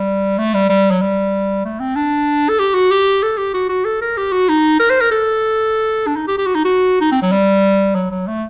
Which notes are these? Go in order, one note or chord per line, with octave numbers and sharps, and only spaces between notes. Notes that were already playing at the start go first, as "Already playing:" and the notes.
Already playing: G3
A3
G3
G3
F#3
G3
A3
C4
D4
A4
G4
F#4
G4
A4
G4
F#4
F#4
A4
A#4
G4
F#4
D#4
A#4
C5
A#4
A4
D4
D#4
G4
G4
F#4
D#4
F#4
D#4
C4
F#3
G3
F#3
F#3
A3